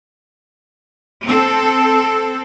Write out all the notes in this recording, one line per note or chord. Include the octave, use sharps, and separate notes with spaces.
C4 A4